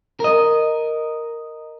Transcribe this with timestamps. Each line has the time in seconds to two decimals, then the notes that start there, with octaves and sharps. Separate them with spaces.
0.20 A#4 D#5